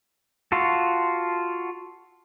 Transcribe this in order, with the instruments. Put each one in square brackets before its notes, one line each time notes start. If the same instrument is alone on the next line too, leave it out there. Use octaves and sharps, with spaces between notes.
[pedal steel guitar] F4 F#4 A4